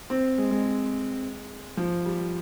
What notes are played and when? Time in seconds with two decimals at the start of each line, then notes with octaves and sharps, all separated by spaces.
0.10 C4
0.38 G#3
0.51 G#3
1.77 F3
2.06 G3